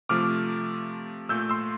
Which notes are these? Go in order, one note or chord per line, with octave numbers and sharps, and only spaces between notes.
C3 F3 A3 D6 F6
A#2 A3 E6 G6
C6 E6